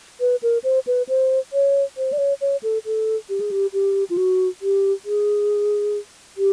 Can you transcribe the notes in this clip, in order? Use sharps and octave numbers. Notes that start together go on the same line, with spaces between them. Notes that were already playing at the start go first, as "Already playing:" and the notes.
B4
A#4
C5
B4
C5
C#5
C5
D5
C#5
C#5
A4
A4
G4
G#4
G4
G4
F4
F#4
G4
G#4
G4